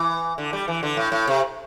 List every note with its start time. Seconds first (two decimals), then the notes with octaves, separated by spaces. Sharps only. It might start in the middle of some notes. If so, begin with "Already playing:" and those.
Already playing: E3
0.38 D3
0.53 G3
0.68 E3
0.83 D3
0.97 A2
1.12 A2
1.27 C3